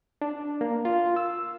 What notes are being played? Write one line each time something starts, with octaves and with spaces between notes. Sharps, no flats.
D4
A#3
F4
E6